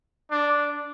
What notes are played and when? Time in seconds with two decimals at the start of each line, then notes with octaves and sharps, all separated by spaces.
0.31 D4